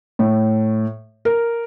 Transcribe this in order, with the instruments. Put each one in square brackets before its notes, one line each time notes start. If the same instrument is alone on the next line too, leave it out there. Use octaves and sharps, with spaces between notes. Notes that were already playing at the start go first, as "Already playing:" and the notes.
[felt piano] A2
A#4